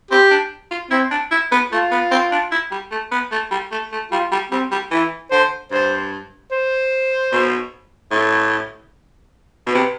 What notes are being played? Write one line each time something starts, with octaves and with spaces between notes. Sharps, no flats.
C4 G4
D4
F4
C4 E4
D4
E4
B3
A3 F4
B3
C4
D4
E4
G3
A3
B3
A3
G3
A3
A3
G3 F4
G3
G3 C4
G3
E3 E4
D3 C5
G2 C5
C5
B2
A2
B2
C3 B4